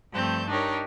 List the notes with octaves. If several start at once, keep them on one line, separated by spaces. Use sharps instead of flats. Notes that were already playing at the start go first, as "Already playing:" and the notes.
G2 F3 A3 C4 A5 G6
D4 D#4 G4 A#4 C#5